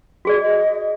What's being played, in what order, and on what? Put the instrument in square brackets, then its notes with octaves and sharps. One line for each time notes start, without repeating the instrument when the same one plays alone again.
[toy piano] F#4 G#4 D5
[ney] D#5